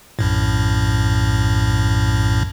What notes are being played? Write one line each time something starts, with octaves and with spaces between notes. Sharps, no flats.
A#1 F#2 A2